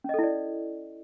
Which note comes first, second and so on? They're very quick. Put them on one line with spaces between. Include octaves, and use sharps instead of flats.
C#4 D#5 A4 E4 D5